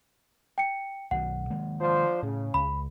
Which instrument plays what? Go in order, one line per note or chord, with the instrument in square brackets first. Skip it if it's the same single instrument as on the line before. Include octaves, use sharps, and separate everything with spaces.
[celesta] G5 C#7
[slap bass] B1 B2 D#3 [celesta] F#5
[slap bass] D#3 G#3 A#3
[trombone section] F3 D4 C5
[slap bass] A2 [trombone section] C#3
[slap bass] C#2 [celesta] B5